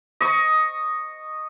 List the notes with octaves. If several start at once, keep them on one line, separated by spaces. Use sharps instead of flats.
D#5 C#6